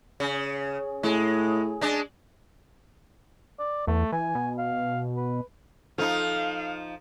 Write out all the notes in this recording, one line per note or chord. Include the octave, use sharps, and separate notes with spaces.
C#3
A2 G#3
G#3 D4
D5
E2 A3
E3 G#5
B2
F5
B4
F3 D#4 A4 F5